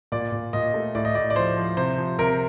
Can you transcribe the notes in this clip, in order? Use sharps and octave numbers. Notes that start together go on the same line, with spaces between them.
A#2 D5
A#2
A#2 D#5
A3
A2 D5
D#5
A2 D5
D5
F3 C5
F3
C3 C5
F3
C3 A#4